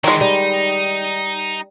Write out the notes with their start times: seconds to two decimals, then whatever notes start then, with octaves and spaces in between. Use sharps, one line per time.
0.04 D#3 E3 G#3
0.21 G3 D#4